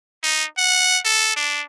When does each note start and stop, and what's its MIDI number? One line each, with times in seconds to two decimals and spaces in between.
0.23 0.44 63
0.58 0.99 78
1.05 1.33 69
1.36 1.62 62